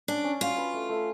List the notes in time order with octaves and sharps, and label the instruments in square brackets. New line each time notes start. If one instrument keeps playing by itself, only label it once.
[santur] C#4 [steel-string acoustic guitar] D4
[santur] C#4
[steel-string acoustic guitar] F4 [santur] F#4
[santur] B4
A3
A3